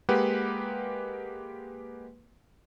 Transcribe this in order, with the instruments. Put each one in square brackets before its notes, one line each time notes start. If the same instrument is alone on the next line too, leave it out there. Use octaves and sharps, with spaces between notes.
[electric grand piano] G#3 A#3 G4 B4 F#5